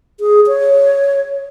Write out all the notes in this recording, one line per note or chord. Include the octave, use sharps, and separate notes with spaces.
G#4
C#5